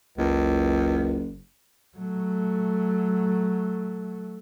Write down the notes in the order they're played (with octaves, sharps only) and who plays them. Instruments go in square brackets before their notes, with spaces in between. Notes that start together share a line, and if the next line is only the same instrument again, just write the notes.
[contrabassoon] F#1 [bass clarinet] C#2
[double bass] F#3 A3